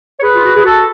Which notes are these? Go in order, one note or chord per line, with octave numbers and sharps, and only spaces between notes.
C#5
G#4 B4
F4
F#4
G#4
F#4 A4